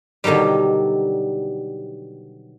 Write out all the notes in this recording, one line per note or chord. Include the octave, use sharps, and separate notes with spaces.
B2 D3 D#3 F#3 G3